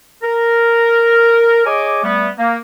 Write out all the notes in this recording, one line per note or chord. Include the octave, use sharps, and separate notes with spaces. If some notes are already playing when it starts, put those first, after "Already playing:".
A#4
G#4 C#5 D#5 G#5 D6
G3 A3 B3
A#3